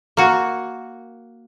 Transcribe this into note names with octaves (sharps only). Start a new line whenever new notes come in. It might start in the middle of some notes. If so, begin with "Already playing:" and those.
A#3 F#4